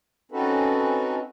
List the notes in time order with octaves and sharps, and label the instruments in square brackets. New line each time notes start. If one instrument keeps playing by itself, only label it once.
[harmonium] C4 C#4 D#4 F#4 A4 B4